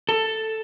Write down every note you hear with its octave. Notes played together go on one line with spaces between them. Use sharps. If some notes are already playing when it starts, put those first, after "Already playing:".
A4